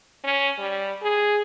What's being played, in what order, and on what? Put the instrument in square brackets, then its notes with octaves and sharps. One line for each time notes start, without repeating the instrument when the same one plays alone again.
[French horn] C#4
G3
G#4